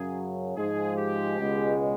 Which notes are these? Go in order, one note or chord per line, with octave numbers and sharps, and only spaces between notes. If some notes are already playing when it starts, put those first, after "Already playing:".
Already playing: F#2 C#3 F#3 G#4
G#2 F3 G#3 G#4
G4
C#2 B2 G#3